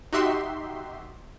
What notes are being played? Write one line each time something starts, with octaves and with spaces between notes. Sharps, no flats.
D#4 F#4 G4 E5 C6